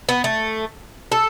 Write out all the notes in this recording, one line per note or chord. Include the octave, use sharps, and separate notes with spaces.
B3
A3
A4